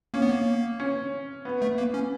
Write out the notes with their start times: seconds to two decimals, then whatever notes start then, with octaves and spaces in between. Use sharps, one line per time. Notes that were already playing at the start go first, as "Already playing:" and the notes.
0.14 A#3 C#4
0.22 B3
0.30 A#3
0.80 C#4
1.45 B3
1.62 A3
1.78 A#3
1.94 C#4